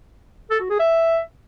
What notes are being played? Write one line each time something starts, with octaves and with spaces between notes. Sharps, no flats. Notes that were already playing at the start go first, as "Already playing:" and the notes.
A4
F#4
G#4
E5